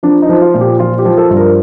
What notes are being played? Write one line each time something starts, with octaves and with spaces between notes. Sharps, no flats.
F3 D4
D#4
F3
F4
A#2
G4
F3 F4
G4
F3
A4
G2
A#4